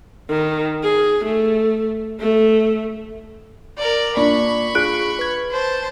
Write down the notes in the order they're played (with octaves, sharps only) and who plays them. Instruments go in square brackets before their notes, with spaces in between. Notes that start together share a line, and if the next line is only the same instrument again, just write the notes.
[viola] D#3
G#4
A3
A3
[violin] A#4 D5
[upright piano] A#2 D4 [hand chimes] D5 [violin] B5 C#6
[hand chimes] F4 G#4 D7 [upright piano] F#6
[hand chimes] B4 G#6
[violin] C5 A5